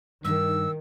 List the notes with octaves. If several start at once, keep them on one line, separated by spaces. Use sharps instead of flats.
G2 D#3 E6